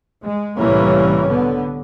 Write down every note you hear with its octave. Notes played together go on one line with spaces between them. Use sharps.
G#3
C2 A2 E3 G3 A#3 C#4
D3 B3